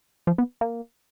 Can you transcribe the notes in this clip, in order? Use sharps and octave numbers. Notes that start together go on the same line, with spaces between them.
F3
B3
A#3